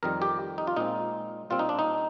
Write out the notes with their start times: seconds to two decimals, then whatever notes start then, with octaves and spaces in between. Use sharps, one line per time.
0.03 F2 D#3 G3 A#4
0.22 G4
0.58 D#4
0.67 F4
0.77 A#2 G#3 C4 D#4
1.50 A#2 G3 C4 F4
1.59 D#4
1.69 D4
1.79 D#4